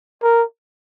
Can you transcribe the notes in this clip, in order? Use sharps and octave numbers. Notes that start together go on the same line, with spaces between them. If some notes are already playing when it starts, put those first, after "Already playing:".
A#4